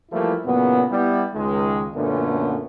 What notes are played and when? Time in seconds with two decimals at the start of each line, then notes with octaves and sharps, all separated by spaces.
0.11 E3 F3 G3 A3 A#3 E4
0.45 E2 A#2 C#3 F#3 B3
0.91 G3 B3 E4
1.34 C#2 D#3 G#3
1.94 F#2 A#2 D3 A3 B3 C#4